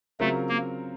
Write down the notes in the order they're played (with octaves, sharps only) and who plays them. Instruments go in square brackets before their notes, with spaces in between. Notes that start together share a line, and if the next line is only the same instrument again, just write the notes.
[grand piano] C#3 F#3 C4 F4 A#4 [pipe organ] A3
[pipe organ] A#3